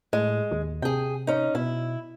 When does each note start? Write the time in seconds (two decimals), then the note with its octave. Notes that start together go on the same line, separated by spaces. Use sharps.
0.13 A2 G#3
0.51 D#2
0.82 C3 G#4 G5
1.27 C#4 D#4
1.55 B2 E4